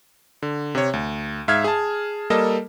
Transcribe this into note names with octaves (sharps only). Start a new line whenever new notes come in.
D3
C3 C#5
D2
G#2 E5 F5 F6 G#6
G#4 A5
G3 A#3 A4 A#4 D#5 A5